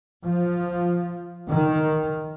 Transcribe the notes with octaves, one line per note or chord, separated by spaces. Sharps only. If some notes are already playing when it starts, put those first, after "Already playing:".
F3
D#3